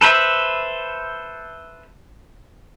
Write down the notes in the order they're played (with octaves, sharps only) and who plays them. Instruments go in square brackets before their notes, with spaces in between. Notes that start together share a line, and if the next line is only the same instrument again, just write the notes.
[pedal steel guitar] A4 B4 C5 E5